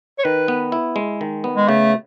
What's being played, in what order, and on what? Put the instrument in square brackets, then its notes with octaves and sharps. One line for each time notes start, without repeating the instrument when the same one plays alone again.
[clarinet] C#5
[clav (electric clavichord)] D#3 [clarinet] B4
[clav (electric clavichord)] B3
E4
G#3
D#3
B3
[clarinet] G#3
[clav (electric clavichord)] C#3 [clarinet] A3